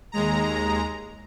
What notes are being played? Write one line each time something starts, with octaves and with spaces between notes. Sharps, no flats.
D#2 G#3 A#5